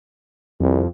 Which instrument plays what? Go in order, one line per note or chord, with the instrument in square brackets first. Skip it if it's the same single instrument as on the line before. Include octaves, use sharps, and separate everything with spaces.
[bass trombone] C2 [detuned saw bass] F2